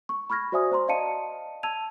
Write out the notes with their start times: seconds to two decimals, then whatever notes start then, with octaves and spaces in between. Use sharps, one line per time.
0.09 C#6
0.30 B5 C#6 F6 G#6 A#6
0.52 F#4 C5 D5 E5 G#5 D#6
0.71 C5 A#5 C6
0.88 D5 D#5 F5 A5 C#7 D#7
1.63 A5 E6 G#6 D#7 F7